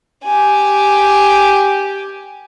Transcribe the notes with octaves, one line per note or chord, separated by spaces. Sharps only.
G4 G#5